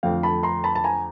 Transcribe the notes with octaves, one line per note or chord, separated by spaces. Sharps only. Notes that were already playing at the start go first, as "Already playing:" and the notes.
F2 D3 F3 A3 F5 G5
A5 B5
A#5 C6
A5 B5
A5
G#5 A#5